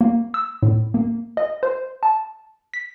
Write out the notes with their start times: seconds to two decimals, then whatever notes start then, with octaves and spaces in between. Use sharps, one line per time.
0.01 A#3
0.34 E6
0.63 A2
0.94 A#3
1.37 D#5
1.63 C5
2.03 A5
2.74 B6